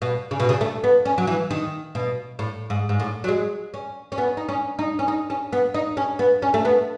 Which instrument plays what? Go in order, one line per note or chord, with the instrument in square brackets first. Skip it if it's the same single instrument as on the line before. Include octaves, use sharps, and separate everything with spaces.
[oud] B2
C#3
B2
C#3
A3
B3
C#4
F#3
E3
D#3
B2
A2
G#2
G#2
A2
F#3
G#3
C#4
C#4
B3
D#4
C#4
D#4
C#4
D#4
C#4
B3
D#4
C#4
B3
C#4
A3
B3